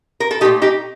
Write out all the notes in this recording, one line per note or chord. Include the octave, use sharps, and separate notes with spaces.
A#4
A4
A#2 A3 D#4 G4
D#4 G4